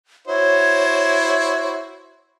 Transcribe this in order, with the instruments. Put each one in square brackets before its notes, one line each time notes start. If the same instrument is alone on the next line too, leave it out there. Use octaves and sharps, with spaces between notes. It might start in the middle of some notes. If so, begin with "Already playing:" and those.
[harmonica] E4 F#4 C5 [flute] C#5